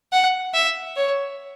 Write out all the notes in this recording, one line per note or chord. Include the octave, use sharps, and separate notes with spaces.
F#5
E5
C#5